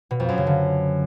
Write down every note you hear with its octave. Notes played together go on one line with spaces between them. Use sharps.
B2
F2
F#2
C#3
D3